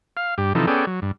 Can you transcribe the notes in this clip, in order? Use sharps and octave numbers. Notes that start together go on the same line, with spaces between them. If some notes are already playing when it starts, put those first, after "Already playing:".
F5
G2 G4
C3 E3 F3 D#4 A4
B3 C#4 G#4 A4 D5 G5
F#3
G2